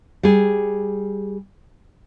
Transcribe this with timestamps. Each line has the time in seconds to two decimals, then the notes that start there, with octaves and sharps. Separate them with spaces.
0.23 G3 G#4